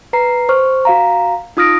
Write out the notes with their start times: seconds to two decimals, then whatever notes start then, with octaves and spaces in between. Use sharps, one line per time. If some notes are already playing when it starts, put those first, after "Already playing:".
0.13 B4 A#5 C7
0.49 C5 C#6 F6
0.85 F#4 F5 A#5
1.57 D#4 F4 D#6 F6 A#6 D7